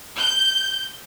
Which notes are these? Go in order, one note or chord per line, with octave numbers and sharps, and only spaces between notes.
G6